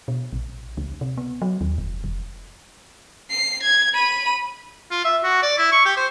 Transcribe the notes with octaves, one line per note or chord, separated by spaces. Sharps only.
B2
A#1
C#2
C3
B3
F#3
D#2
F1
F1
C7
G#6
B5 D#7
F4
E5
F#4
D5
E4
C#6
G4
C5